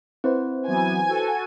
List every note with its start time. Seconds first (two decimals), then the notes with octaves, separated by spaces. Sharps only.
0.24 C4 E4 B4 C5
0.68 E3 F#3 B3 G#5
1.09 F#4 A4